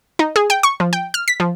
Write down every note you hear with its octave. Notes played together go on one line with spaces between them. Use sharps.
D#4
G#4
G5
C#6
F3
G5
F6
B6
F3